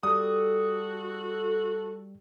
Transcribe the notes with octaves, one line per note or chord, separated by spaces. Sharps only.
G3 F#4 A4 D#6